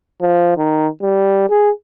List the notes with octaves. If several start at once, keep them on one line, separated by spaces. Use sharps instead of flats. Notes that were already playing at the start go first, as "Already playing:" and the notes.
F3
D#3
G3
G#4